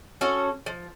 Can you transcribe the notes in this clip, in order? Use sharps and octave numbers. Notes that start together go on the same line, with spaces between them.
C#4 F#4 A4
F3